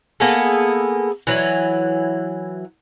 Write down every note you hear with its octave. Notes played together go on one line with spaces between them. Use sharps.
A#3 B3 G#4 A4
E3 F#3